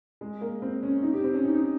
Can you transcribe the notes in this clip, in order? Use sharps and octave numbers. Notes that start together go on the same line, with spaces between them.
G#3
A#3
C4
C#4
D#4
G4
C4
C#4
D#4
D#4